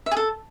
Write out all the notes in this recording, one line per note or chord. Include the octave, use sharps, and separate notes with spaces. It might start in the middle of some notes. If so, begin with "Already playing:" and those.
E5
G#4
A4